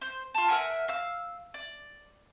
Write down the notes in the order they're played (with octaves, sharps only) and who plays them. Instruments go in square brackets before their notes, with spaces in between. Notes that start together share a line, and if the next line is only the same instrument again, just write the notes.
[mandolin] C5 G6
F4 A5
A#4 E5 F#5 G#5
F5 E6
D5